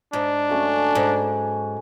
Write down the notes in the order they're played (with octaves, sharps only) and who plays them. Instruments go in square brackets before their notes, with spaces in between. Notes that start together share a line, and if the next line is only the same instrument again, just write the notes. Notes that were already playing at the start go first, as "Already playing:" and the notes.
[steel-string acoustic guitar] G#2 [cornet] D4
[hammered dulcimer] F#3 A3 C#4
[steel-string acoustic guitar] G#2 [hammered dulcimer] G#5